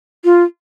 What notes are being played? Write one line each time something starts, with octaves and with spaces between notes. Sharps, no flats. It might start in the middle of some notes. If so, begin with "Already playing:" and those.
F4